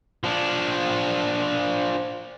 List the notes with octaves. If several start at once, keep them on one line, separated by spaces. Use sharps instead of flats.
F3 D4